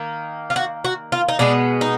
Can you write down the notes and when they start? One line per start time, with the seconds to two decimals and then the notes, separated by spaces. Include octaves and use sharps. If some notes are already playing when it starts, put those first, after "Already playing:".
Already playing: D#3 A#3
0.50 F4
0.56 F#4
0.85 F#4
1.12 F4
1.28 D#4
1.39 B2 G#3 B3 D4
1.81 D#4